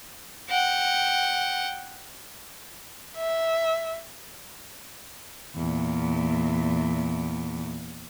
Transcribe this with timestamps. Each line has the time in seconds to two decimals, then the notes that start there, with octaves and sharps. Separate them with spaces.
0.49 F#5 G5
3.17 E5
5.56 E2 A#2